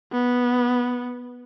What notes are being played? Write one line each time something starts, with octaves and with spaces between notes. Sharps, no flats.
B3